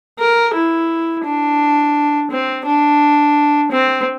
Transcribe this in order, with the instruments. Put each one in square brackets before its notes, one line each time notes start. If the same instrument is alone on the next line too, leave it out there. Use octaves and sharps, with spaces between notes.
[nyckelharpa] A#4
E4
D4
C4
D4
C4